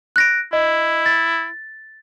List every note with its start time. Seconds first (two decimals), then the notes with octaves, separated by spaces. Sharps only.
0.16 F#6 A#6 D7
0.53 E4 D#5
1.06 A6